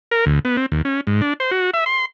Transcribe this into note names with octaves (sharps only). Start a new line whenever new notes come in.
A#4
D2
B3
C4
D#2
C#4
G#2
D4
C5
F#4
E5
C6